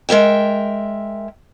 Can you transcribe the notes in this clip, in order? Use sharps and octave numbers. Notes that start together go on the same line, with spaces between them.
G#3 A#4 E5 G5